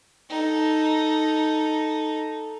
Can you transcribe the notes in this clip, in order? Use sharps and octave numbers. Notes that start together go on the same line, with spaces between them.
D#4 A4